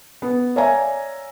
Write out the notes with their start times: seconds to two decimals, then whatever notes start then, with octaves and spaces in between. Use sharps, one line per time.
0.22 B3
0.56 C#5 D5 E5 F5 G#5 A#5